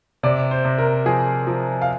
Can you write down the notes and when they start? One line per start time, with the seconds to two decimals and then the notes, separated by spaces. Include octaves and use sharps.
0.23 C3 D5
0.51 C5
0.65 C3
0.78 A#4
1.06 F3 G#4
1.47 F3
1.82 F5